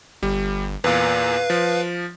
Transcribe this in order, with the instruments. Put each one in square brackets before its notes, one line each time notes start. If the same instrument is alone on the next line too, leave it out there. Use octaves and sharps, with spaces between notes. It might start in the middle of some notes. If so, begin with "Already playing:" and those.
[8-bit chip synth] G1 [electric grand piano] G3
[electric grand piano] E2 A#2 [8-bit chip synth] B4 F5
[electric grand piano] F3